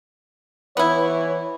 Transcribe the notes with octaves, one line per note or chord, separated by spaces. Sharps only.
E3 B3 E4 C#5